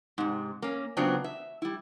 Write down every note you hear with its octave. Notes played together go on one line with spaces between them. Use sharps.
G#2 C3
A#3 C#4
C#3 F#3 B3 C4 D4 F4
E5
G3 E4